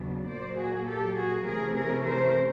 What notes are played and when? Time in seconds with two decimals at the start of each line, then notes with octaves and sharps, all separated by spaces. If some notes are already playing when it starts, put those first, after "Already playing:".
Already playing: D#2 C#3 F#3 B3 D4
0.29 A#2 F#3 A#3 C5 D5
0.59 F#4 G#4
0.88 G4 A4
1.18 F#4 G#4
1.47 C3 E3 A3 C#4 G#4 A#4
1.76 G#4 A#4
2.06 A#4 C5